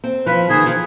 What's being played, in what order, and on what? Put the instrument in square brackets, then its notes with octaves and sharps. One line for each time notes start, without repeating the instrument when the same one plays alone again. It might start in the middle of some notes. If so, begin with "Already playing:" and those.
[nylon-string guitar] C4
[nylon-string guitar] F3 [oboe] B4
[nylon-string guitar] D#3 [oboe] G#4
[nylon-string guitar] F3